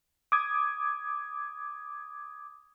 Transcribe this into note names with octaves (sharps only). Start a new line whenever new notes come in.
D6 D#6 G#6